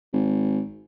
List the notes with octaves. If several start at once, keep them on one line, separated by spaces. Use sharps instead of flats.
G#1